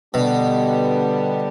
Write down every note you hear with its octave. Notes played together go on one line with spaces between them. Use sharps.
B2 D3 G3 B3 D4 G4